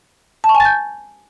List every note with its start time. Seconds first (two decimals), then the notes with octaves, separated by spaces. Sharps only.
0.44 A5
0.49 C#6
0.55 G#5
0.60 A6
0.65 G6